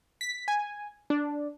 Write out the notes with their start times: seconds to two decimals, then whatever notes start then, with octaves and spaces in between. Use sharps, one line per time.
0.21 B6
0.48 G#5
1.10 D4